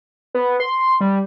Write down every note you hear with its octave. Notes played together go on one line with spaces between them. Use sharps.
B3
C6
G3